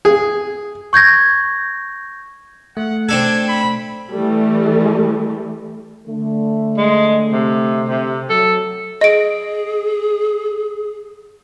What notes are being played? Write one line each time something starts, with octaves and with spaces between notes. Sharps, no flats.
G#4
C#6 G6 G#6 A#6
A3 F#5
C4 D4 A4 G#6
B5
E3 G3 A3
D3 A3
G#3
C3
C3
F#3 A4
G#4 D#5 D7